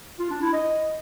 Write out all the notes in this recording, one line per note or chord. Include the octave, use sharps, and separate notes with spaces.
F4
D4
E4
D#5